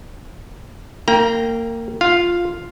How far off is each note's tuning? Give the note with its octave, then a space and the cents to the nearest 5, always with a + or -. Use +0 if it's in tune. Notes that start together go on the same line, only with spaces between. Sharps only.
A#3 -25 G5 -5 A#5 +20
F4 +0 F5 +5